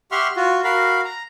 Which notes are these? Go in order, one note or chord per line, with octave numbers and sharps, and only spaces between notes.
G4 E5 F#5 C6 C#6 F6
F4 F#4
F#4 A#4 F5 B5
A#5